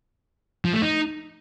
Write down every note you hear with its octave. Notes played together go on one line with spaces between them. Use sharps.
F3
A3
D#4